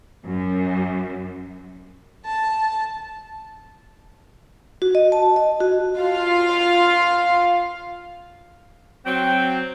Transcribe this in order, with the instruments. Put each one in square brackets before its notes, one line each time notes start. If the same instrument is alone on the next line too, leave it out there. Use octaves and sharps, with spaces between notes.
[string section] F#2
[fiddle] A5
[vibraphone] F#4
D#5
A5
D#5
F#4
[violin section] F4 F5
[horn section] F#3 C4 [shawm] G5